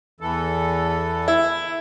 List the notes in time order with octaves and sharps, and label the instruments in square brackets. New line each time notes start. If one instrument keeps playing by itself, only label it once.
[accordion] E2 E3 A4
[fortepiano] E4